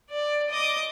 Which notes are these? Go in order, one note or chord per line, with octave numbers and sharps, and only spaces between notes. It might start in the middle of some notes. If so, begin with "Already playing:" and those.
D5
D#5 D6